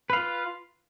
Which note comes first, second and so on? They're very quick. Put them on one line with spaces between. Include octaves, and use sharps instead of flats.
B4 F5 F4